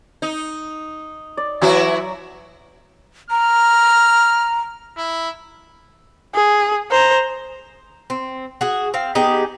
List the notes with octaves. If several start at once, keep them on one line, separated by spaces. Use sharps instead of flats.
D#4
D5
E3 F#3 E4 F#4
A#5 F6
E4
G#4
C5 A#5
C4
F#4 G#4
C4 F5
B3 D#4 G4 G#4